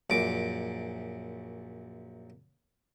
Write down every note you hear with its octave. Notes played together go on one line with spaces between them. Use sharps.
A#1 F#2 D6